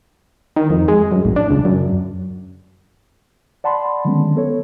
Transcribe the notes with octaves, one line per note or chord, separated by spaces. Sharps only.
D#3
F2
G#3
F#2
A1
D4
C#2
F#2
D5 F#5 A5 B5 C6
D3 D#3 F#3 G#3 B3 C#4
B3 A4 C#5